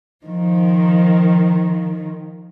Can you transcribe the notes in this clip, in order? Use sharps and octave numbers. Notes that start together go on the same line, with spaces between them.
D#3 F3